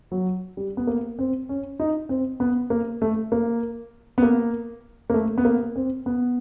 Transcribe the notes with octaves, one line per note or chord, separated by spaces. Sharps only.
F#3
G3
B3
A#3
C4
C#4
D#4
C4
B3
A#3
A3
A#3
B3
A#3
A#3
A3
B3
A#3
C4
B3